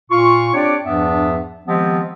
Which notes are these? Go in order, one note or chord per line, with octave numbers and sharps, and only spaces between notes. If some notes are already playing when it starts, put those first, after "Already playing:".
A#2 F4 C#6
C4 D4 G4 C#5 D5
E2 G2 F3 B3 D4 E5
D#3 F3 G#3 B3 C4 G4